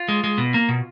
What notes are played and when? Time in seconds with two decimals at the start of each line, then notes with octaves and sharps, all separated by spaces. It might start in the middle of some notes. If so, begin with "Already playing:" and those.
Already playing: F4
0.09 G#3
0.24 G#3
0.38 B2
0.54 A#3
0.69 B2